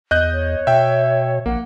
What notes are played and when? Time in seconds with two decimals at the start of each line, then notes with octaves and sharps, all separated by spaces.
0.11 E2 D#5 F#6 G6
0.33 C#5
0.67 B2 E5 G5
1.46 A#1 A#3 F#5